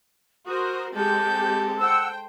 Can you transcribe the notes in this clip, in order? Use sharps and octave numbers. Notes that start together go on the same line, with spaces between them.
F#4 A#4 C5 D#6
G#3 C4 G4 A4 G6
C5 F#5 G5 E6